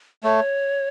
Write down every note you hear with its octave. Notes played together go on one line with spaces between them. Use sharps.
A3 C#5